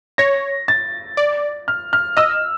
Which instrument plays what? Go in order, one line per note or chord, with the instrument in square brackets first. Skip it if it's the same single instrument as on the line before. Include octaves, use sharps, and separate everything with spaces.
[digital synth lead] C#5 [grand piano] A#6
[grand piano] A6
[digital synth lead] D5
[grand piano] F6
F6
[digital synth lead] D#5 [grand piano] E6